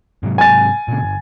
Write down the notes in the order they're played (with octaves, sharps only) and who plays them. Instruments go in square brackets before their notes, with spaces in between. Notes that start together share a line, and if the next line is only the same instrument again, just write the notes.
[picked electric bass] G#2 C3 F#3
[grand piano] G#5 A6
[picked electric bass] A#2 C#3
G1